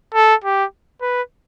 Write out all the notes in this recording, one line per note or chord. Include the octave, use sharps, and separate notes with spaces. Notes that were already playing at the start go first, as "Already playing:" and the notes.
A4
G4
B4